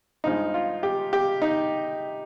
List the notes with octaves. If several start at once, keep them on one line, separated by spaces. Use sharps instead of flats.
G2 F3 G#3 D#4
F4
G4
G4
D#4